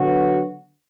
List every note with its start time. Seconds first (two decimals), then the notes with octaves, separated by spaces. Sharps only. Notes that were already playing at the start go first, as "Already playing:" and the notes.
Already playing: D3 F#3 B3 F#4